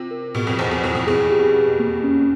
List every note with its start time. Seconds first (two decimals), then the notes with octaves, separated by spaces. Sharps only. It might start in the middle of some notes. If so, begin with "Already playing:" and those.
Already playing: C3 F4
0.11 A#4
0.35 B2 G#4
0.47 F2
0.59 E2 C5
0.71 F2
0.84 F2 E4
0.95 F2
1.07 F2 G#4
1.31 G4
1.55 B4
1.79 A#3
2.04 C#4